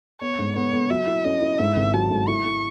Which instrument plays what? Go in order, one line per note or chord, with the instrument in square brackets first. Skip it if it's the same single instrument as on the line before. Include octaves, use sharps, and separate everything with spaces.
[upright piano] B3 [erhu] C#5
[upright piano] G#2
[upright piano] B3 [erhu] C#5
[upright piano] B3
[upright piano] F#3 [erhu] E5
[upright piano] E4
[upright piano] C#4 [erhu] D#5
[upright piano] E4
[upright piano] G#2 [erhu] E5
[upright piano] G#1
[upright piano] F#3 [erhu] A5
[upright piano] G#2
[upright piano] E4 [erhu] C#6
[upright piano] E4